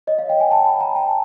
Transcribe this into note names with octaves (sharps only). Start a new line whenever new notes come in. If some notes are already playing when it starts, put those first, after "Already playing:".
C#5 D#5
D#5 F5
F5 G5
F#5 G#5
G5 A5
A5 B5
G#5 A#5
G5 A5